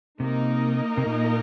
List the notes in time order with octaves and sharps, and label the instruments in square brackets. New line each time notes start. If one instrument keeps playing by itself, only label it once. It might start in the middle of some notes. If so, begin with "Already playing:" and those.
[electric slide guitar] C3 [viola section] A#3 D#4 A#4 D#5
[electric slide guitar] C3
A#2